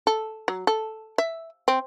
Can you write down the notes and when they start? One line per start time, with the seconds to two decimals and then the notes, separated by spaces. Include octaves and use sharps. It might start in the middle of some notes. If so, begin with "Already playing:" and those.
0.07 A4
0.48 F#3
0.67 A4
1.18 E5
1.68 C4